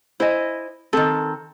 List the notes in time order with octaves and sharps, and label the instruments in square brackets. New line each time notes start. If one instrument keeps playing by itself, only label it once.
[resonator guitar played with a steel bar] E4 D#5 [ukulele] C5 G#5
[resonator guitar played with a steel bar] D#3 C4 [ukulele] A4